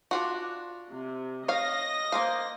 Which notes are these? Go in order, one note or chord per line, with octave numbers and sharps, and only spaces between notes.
D4 F4 F#4
C3
C#5 D#5 F5 A#6
A#3 C5 F5